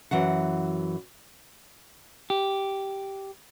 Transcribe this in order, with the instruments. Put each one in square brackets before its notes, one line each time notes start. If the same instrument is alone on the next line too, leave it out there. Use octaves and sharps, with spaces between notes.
[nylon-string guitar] F#2 E3 F#4 F#5
[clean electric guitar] G4